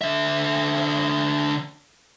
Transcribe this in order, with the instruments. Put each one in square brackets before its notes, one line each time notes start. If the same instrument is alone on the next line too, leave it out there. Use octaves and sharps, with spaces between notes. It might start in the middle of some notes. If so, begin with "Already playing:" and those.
[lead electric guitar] D3 E5